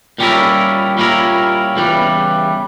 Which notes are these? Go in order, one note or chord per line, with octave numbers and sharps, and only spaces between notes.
A#2 G3 C#4 E4 A#4
A#2 G3 C#4 E4 A#4
E2 C#3 E3 G3